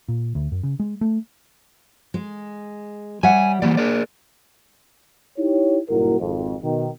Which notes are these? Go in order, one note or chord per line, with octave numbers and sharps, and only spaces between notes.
A#2
D2
F#2
C#3
G#3
A3
G#3
G3 C#5 E5 F#5 G#5
E3 G3 A#3 D5
G#4 A#4 D5
D#4 E4 G4 C#5
F#1 G2 A#2 E4 F#4 A#4
G#1 F2
B2 D#3